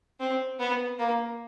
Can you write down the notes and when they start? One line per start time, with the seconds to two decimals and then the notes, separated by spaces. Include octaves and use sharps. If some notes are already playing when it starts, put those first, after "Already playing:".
0.20 C4
0.60 B3
0.98 A#3